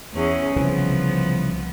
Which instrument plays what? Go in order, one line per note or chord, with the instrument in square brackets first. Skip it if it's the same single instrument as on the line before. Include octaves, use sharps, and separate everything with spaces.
[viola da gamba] E2 C#4 G#4
[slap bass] C2 C#3 E3 [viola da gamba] F3 B3